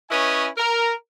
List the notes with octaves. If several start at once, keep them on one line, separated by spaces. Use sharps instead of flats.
C#4 E4 B4 C#5 D#5 G#5
A#4